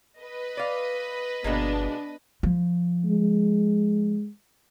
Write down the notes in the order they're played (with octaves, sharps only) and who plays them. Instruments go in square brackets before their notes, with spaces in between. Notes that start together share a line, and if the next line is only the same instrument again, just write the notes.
[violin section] B4 D#5
[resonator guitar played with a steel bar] D5 F5
[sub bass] G1 [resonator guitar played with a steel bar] B2 G#3 A#3 [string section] B3 D4
[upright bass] F3
[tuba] G#3